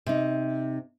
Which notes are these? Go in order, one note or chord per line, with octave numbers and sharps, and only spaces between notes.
C3 D#4